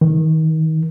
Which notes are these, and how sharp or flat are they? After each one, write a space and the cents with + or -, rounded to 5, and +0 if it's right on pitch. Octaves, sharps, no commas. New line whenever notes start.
D#3 +30